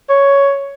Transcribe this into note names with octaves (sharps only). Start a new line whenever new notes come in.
C#5